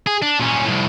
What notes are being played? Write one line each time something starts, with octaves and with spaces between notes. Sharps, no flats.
G#4
D4
A#2 C#4
C2 A2